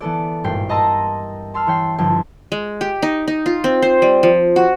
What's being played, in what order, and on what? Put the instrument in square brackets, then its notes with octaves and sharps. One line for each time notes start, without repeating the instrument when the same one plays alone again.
[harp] E3 B3 A4 D5
G#1 G2 A#2 G5 C7
A#4 D#5 A5 A#5 C6 E6
A5 C6 E6 F6
E3 C#5 G5 C7
G1 D3 F3 G5 A5 G#6
[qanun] G#3
G4
D#4
D#4
F4
C4
C5
G3
F3
F#4